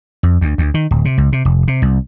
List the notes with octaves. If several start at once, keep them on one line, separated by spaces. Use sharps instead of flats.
F2
D2
D2
D#3
D1
C3
C#2
C3
F1
C3
C2